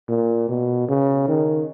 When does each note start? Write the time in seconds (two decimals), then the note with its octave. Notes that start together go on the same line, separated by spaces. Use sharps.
0.08 A#2
0.49 B2
0.88 C#3
1.28 D#3